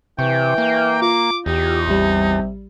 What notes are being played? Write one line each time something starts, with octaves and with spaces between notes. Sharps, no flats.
C3 E3 G5 C#6
A#3
F4 D6
E2 D#4 G4
A1 C3 G3